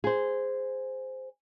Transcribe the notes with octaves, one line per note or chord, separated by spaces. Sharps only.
G#4 C5